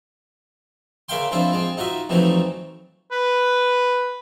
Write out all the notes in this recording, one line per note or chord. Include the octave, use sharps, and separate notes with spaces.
C#3 A#3 E5 F5 G5 C6
F3 G#3 C4 D4 E4 F4
F3 G#3 C4
D#4 F4 F#4 E5
F2 C3 E3 F#3 A3 D#4
B4